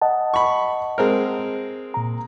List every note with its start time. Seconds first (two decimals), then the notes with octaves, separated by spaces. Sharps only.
0.02 D#5 F#5 A5
0.34 B5 C#6
0.98 G#3 C4 A#4
1.94 A#2 A#5